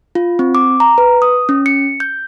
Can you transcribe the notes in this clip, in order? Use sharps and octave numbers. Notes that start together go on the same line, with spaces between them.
F4
C4
D6
A#5
B4
D#6
C#4
C#7
G6